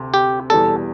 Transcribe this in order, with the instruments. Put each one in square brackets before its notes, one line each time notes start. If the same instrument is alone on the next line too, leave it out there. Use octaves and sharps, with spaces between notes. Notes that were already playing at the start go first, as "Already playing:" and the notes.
Already playing: [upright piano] D2 C3 C4
[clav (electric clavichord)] G4
[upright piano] E2 B2 G3 [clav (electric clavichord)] A4